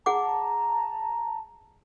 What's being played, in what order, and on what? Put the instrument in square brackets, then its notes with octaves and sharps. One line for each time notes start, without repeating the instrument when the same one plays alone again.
[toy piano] G#4 F#5 D6 [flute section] A5 A#5